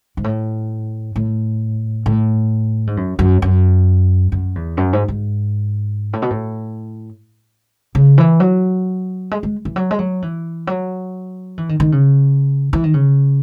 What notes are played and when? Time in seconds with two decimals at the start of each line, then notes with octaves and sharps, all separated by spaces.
0.17 G#2
0.24 A2
1.16 A2
2.06 A2
2.87 G#2
2.97 F#2
3.19 F#2
3.42 F#2
4.32 F#2
4.55 E2
4.77 F#2
4.93 G#2
5.08 G#2
6.13 A2
6.22 B2
6.30 A2
7.95 C#3
8.18 E3
8.40 F#3
9.31 G#3
9.43 G#3
9.65 E3
9.76 F#3
9.91 G#3
9.99 F#3
10.22 E3
10.67 F#3
11.58 E3
11.69 D#3
11.80 D#3
11.92 C#3
12.73 E3
12.84 D#3
12.94 C#3